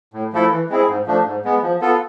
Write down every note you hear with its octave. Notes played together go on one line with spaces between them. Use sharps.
A2
F3 A3 E4 A4
E3
G#3 C4 E4 G#4
G#2
F3 A3 D4
G#2
G#3 B3
F3
B3 F4 A4